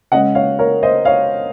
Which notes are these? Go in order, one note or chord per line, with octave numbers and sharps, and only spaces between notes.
C#3 G#3 C#4 D#5 F#5
C#5 F5
A#4 C#5
C5 D#5
C#5 F5